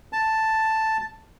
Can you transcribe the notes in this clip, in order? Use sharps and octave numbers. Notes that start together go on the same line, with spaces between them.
A5